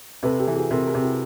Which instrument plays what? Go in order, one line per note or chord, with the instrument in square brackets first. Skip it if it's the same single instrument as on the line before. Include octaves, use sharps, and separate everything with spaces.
[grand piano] C3 [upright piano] A4 B4
[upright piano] G4 A4
[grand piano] E3
[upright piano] F#4 G#4
[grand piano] C3 [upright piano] G#4 A#4
[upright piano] G#4 A#4
[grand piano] C3
[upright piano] E4 F#4